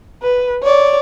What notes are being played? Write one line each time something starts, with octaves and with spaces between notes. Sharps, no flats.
B4
C#5 D5